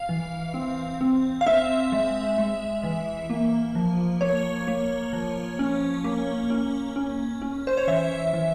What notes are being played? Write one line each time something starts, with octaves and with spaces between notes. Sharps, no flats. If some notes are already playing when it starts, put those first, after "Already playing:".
Already playing: F5
E3
C4
C4
F5
C4 E5
G#3
G#3
E3
A#3
F3
A#3 C#5
A#3
F3
C#4
A#3
C#4
C#4
C#4
C5
C#5
E3 E5
E3